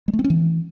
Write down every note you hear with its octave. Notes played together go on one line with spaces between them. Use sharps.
G#3
A3
C4
C#4
E3